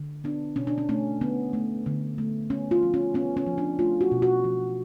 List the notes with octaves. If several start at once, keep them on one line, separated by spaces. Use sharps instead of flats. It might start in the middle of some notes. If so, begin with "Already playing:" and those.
Already playing: D3
B3 D4
B2 C#4
D4
C#4
A3 C#4
D3 B3
A3
D3
A3
B3 C#4
F4
F3
C#4
B3 C#4
C#4
F3
D4
A3 F4
F#4
B2
F#4
F3